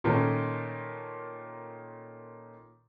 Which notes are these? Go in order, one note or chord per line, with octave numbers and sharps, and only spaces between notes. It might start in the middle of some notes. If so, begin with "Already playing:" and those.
A#2 D#3 A3 C#4